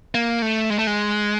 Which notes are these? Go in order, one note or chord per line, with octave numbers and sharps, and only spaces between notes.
A#3
A3
G#3
A3
G#3